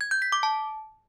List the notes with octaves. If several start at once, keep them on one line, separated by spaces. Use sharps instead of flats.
G#6
G6
B6
D6
A5